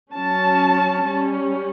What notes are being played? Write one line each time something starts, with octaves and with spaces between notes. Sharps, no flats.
F#3 C#4 A5
G3 C#4